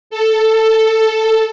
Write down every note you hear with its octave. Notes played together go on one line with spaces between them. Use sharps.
A4